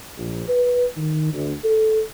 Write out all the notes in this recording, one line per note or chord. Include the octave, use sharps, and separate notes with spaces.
A#1
B4
D#3
D2
A4